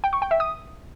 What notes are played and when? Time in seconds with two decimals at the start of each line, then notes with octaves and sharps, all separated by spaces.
0.04 G5
0.13 C#6
0.22 G5
0.31 E5
0.40 D#6